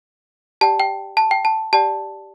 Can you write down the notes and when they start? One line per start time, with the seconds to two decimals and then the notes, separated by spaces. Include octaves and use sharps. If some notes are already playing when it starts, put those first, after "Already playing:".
0.61 G4 D5 G5 A5
0.80 G5
1.17 A5
1.31 G5
1.45 A5
1.73 G4 D5 G5 A5